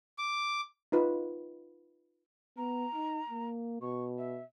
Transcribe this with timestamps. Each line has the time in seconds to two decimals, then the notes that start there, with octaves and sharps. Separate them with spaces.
0.18 D6
0.92 D#4 F4 B4
2.57 B3 A#5
2.95 D#4
3.30 A#3
3.81 B2 C#6
4.18 E5